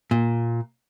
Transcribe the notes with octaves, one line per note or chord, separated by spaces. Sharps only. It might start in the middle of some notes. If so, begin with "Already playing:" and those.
A#2